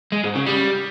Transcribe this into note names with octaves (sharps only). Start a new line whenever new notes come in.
G#3
G#2
C#3
G3